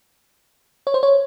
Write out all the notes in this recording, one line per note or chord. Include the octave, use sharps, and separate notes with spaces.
C#5
C5
C#5